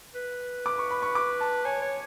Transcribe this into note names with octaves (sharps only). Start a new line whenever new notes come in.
B4
D6
C#6
B5
C#6
D6
A5
C#5 G#5
C#5